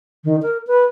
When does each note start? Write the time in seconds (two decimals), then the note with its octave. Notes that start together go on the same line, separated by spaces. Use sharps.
0.24 D#3
0.42 A#4
0.67 B4